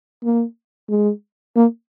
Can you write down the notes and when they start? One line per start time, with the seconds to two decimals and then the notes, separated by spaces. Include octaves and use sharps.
0.24 A#3
0.90 G#3
1.56 A#3